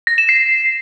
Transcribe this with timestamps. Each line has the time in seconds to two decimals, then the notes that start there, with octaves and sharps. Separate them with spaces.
0.07 A#6
0.18 E7
0.29 C7